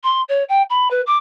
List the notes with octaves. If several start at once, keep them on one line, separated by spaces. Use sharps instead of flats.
C6
C#5
G5
B5
B4
D6